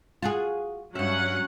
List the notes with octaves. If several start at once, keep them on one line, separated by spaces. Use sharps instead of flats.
F4 F#4 G#4
G2 F#3 C#4 E5 F#5